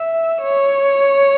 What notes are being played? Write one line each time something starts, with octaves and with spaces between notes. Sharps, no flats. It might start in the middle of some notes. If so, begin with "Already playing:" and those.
Already playing: E5
C#5